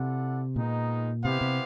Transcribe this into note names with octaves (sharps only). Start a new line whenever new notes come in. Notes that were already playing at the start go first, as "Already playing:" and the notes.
Already playing: C3 E4 A4 D5 F#5
A#2 G#3 B3 D#4
C3 B3 E4 G4 C5 F5
C3